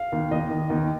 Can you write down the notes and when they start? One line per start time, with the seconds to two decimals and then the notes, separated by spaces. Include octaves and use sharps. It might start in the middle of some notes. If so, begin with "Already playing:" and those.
Already playing: F5
0.12 D#2
0.31 D#2 D#5
0.50 D#2
0.70 D#2